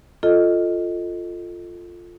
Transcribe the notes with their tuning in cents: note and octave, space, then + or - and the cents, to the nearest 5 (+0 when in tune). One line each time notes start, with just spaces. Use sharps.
F4 +0 A4 +0 D#5 +0